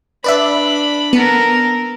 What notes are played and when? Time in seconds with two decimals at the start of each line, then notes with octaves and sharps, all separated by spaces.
0.24 D4 B4 D5 E5 B5
1.13 B3 A4 A#4